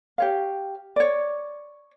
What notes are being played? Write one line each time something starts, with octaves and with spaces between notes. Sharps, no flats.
G4 C#5 F5
C#5 D5